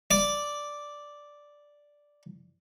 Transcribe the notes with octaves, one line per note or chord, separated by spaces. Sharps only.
D5 D6